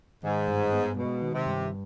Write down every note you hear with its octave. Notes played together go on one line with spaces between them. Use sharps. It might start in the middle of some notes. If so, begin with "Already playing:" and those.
G#2 D#3
G2
B3
B2 G#3
D#3
C3
G2